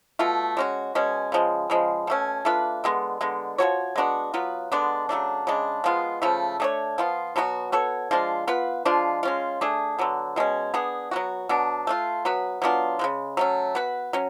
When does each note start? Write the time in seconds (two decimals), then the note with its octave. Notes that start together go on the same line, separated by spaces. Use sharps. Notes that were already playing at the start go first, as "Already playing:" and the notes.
0.19 B2 A3 F4
0.57 G#3 C#4 F#4
0.95 B2 G#3 C#4
1.32 C#3 F3 G#3
1.70 C#3 F3 G#3
2.07 B2 A3 C#4
2.45 A3 D4 F4 B4
2.84 D3 G#3 B3
3.21 D3 G#3 B3
3.58 F3 B3 F#4 C#5
3.96 G#3 B3 D4 F#4
4.34 F#3 B3 F4 B4
4.72 D3 G#3 B3 D4
5.09 C#3 F#3 A3 D4
5.47 C#3 G#3 D4
5.84 F3 G#3 B3 F4
6.22 C#3 F3 A3
6.60 A3 D4 G#4 C#5
6.98 F3 B3 F4
7.36 B2 F#3 B3 F#4
7.72 B3 F#4 A4 C#5
8.11 F3 G#3 D4 F4
8.48 B3 F4 B4
8.85 F3 G#3 D4 F4
9.23 G#3 C#4 F4
9.61 A3 D4 G#4
9.98 D3 F#3 B3
10.36 B2 G#3 C#4
10.74 B3 D4 G#4
11.11 F#3 B3 F#4
11.49 B2 F#3 B3 D4
11.87 A3 D4 F4
12.25 F#3 B3 F#4 B4
12.62 F#3 B3 D4 F4
12.99 F3 G#3
13.04 C#3
13.37 F#3 A3 C#4
13.75 B3 F#4 B4
14.13 F#3 C#4